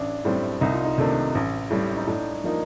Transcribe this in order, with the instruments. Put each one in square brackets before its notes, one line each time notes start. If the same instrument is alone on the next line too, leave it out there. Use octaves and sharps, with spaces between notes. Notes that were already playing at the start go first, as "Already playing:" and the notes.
Already playing: [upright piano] A1 [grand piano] D4
[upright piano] A2 G3 C4
[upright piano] C2 [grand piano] D#4
[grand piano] F4
D#4
[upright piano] C3 D#3 A3 D4
A1
A2 G3
[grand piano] D#4
[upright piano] A2 [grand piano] D4
[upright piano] F3 A#3 D#4